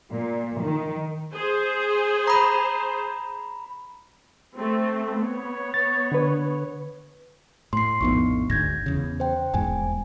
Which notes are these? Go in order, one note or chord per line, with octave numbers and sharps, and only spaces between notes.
A#2
D#3
G#4 C5
A#5 B5
A3 C4
B3 C#5
A6
D3 B4
A2 C6 C7
A#1 F2 A2 B3 D#4 C#6
G#1 D2 G#2 G6 G#6 A#6
E2 C#3
C5 G5
D#1 E2 G#2 G#5